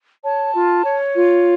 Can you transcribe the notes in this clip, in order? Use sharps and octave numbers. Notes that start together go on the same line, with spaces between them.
C#5 A5
F4
C#5
F4